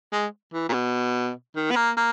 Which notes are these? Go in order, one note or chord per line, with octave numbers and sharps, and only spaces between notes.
G#3
E3
A#2
B2
D#3
B3
A#3
A#3